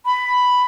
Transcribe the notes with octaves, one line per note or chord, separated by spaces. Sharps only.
B5